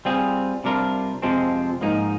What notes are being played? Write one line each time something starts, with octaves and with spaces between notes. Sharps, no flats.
G3 C4 F4 G#4
C3 G3 D4 F4 A#4
F2 C3 F3 G#3 C4
G#2 F3 A#3 D#4